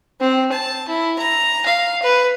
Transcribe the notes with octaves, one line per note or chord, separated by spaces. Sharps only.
C4
A5
E4
A#5
F5
B4